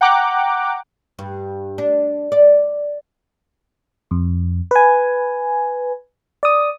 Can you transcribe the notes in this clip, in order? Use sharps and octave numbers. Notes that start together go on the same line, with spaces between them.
F#5 G5 A#5 D6 F#6
G2
D4
D5
F2
B4 G#5
D5 D#6